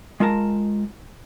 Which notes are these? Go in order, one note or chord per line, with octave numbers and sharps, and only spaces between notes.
G#3 F4 A#4 A5 A#5